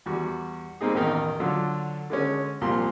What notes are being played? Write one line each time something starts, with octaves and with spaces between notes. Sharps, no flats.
E2 G3 F#4
G3 G#3 A#3 C4 D#4 G#4
A1 E2 B2 D#3 D#4 A#4
D3 F#3 D4 F4
D3 G#3 C#4
C2 A#2 F3 G4 C6